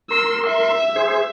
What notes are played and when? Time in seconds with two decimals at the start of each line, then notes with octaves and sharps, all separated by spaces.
0.10 A#4 C6 E6
0.47 E5
0.96 G#4 C5